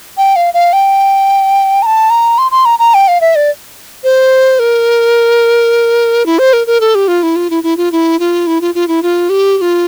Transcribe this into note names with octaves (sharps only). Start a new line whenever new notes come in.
G5
F5
F5
G5
A#5
A5
A#5
C6
C6
A#5
A#5
G5
F5
E5
D5
C5
A#4
E4
C5
A#4
A#4
A4
G4
F4
E4
F4
E4
E4
F4
E4
F4
E4
F4
F4
E4
F4
G4
G4
F4